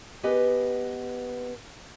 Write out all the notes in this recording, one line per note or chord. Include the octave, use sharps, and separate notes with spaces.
B3 G4 B4 D#5 G#5